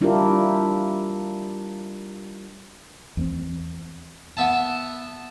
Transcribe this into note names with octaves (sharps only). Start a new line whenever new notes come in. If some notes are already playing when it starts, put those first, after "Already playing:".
G3 D4 E4 F4 G4 A#4
E2 A#3 C4
B3 E5 A5